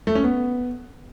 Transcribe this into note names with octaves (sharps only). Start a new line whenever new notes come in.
A3
C#4
B3